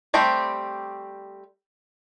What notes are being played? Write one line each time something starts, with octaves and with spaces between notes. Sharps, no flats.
G3 A3 C4 G4